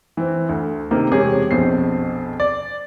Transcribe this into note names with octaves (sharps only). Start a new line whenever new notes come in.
E3 C4
D2
C3 D#3 A#3
E1 C3 G4 G#4 C#5
A#1 F2 B2 C5 C7
D5